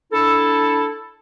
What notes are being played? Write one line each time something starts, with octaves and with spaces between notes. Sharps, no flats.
D4 E4 A4